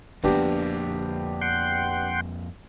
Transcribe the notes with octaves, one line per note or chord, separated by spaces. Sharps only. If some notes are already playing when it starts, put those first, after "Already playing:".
F2 D3 F3 A#3 B3 D4 G4
F#5 G5 C6